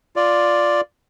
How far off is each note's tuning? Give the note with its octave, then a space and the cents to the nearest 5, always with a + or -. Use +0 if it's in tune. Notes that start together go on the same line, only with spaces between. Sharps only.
F4 +0 D5 +0